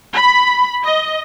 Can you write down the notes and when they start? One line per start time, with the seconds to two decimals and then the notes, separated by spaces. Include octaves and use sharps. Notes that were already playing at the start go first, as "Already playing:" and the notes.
0.13 B5
0.84 D#5